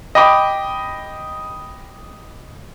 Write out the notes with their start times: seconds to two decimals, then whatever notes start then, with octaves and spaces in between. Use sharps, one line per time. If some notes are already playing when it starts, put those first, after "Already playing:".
0.15 D#5 G5 B5 D6